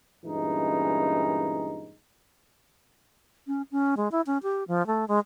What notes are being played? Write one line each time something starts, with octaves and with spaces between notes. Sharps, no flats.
G2 A#2 E3 G#3 C#4 D#4
C#4
C#4
G#3
E4
C#4
G4
F3
A3
G#3